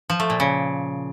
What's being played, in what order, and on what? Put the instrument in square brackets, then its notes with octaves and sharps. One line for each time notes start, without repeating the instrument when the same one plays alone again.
[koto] F3
A3
A#2
C#3